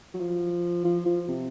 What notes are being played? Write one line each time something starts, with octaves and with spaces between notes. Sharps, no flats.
F#3
F3
F3
F3
C3